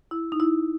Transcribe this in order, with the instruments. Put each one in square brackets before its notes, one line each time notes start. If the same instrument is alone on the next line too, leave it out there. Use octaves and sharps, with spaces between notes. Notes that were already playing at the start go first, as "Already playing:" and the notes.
[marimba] E4
D#4
E4